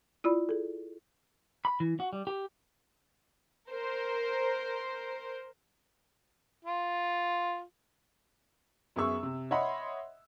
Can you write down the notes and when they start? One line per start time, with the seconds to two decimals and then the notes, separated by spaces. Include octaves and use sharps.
0.24 E4 F4 D5 B5
0.49 G#4 A4
1.65 B5
1.80 E3
2.00 F#4
2.13 G3
2.27 G4
3.70 A#4 C5
6.65 F4
8.96 F#2 B3 G#4 E5 C#6 E6
9.23 C3
9.51 C#5 D#5 E5 F#5 B5 C6